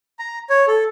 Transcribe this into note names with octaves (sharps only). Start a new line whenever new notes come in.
A#5
C#5
A4